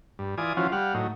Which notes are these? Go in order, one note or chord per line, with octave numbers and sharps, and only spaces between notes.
G2
E3 F4 D5 G#5 D#6
E3 F3 C#4 F4 F#4
G3 F5 F#5
A2 F#3 D#4